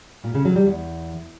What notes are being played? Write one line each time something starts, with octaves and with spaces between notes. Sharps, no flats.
A#2
C#3
F#3
G3
E2